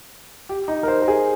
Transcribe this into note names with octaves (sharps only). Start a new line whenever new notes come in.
G4
D#4
A#4
C5
A#4
G#4